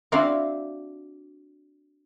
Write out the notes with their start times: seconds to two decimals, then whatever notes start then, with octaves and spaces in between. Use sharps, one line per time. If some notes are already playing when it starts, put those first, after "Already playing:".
0.12 C4 D4 E4 F#4 F5